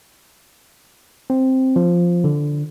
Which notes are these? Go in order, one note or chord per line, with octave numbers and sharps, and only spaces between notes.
C4
F3
D3